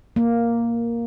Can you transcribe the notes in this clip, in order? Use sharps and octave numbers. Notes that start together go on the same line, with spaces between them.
A#3